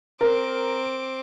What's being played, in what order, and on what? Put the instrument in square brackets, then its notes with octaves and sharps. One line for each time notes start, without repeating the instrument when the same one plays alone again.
[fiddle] C4 D6 [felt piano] A#4